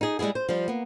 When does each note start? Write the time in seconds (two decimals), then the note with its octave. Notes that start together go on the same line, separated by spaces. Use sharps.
0.01 D#4 G#4
0.19 G3 G#3 B3 E4 G#4
0.35 C5
0.49 F3 G3
0.68 A#3 B3